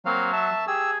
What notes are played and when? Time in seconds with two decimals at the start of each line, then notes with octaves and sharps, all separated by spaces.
0.06 F#3 A#3 C4 F5
0.33 E5 A5
0.67 G4 G#4 E6